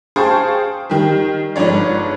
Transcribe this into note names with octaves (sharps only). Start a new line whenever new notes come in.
G#4 C5 F5 G5 A5 C#6
D#3 G3
G1 G#2 F3 C#5 D5